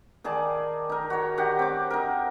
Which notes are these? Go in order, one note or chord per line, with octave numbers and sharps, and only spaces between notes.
D#3 G#4 D5 A5
D#4 A#4
F#4 C#5
D#3 G4 F#5
C4 D6
D#4 A#4